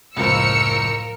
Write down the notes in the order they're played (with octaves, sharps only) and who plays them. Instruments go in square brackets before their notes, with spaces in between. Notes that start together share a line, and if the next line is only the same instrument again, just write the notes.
[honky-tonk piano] F#1 C#2 [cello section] A2 F3 [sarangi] A#4 [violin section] E6 C#7